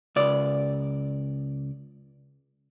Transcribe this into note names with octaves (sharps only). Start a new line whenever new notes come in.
C#2 D5